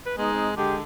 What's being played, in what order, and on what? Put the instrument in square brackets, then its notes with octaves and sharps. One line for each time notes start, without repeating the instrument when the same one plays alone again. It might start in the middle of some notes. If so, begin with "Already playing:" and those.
[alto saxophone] B4
[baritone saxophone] G#3 [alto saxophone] B3 [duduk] D#4
[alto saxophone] C4
[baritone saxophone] D3 [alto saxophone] G#3 [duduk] G4